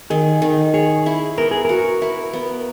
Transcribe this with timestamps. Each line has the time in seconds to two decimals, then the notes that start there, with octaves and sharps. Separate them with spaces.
0.10 D#3 G#4
0.42 D#3
0.74 G#4 C#5
1.06 E4
1.38 B3 A#4
1.51 G#4
1.65 F#4 A#4
2.02 E4
2.33 B3